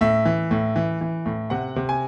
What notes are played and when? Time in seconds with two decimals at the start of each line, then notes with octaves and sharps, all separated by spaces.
0.01 A2 E5
0.25 E3
0.51 A2
0.76 E3
1.01 E3
1.26 A2
1.50 C3 F#5
1.76 C3
1.89 G#5